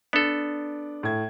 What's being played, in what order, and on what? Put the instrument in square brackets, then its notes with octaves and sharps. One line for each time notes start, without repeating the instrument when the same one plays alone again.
[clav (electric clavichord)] B3 A4 [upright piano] D4
[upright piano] A2 G#6